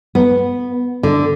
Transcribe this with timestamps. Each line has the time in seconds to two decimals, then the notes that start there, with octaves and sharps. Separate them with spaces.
0.15 B3
1.03 D3